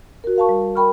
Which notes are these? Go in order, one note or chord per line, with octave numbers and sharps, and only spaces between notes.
F#4 A#4
A#4 F5 A5 C#6
G3
A#4 G5 B5 C#6 F6